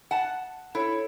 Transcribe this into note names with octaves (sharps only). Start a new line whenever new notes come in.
F#5 A5
E4 A4 C#5